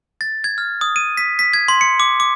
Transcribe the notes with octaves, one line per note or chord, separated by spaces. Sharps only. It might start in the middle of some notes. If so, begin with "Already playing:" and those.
A6
G#6
F6
D#6
D#7
B6
B6
G#6
C6
C#7
D6
D6